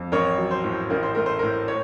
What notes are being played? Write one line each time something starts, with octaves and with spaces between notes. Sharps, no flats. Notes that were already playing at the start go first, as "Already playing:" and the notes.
Already playing: F2
A1 A#4 C#5
F#3
C5
A2
A1 A#4
C5
A3 A#4
C5
A2 A#4
C#5